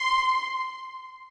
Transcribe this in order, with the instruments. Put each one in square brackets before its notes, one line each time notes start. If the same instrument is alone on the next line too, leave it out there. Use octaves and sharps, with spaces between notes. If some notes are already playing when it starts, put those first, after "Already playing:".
Already playing: [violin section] C6